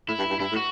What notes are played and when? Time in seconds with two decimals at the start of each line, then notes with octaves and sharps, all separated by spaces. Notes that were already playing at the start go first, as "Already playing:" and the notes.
0.08 A2 E4
0.19 G2
0.30 G2
0.40 G2 E4
0.52 A2
0.56 F#4